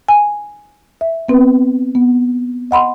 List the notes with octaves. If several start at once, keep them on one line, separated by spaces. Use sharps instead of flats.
G#5
E5
B3 C4 B4
B3
D#5 F#5 B5 C6